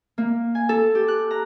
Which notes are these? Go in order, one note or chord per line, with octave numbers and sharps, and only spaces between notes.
A#3
G#5
A4
G4
F#6
A#5